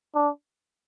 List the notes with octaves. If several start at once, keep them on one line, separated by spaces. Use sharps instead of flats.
D4